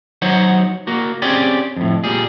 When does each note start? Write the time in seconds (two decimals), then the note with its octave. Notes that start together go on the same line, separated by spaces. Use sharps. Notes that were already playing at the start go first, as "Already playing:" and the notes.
0.22 F#3 D#4 C5 C#5 F#5
0.87 A#3 F#4
1.22 C4 C#4 G4 G#4 D5
1.76 F2 A2
2.04 A#2 G3 G#4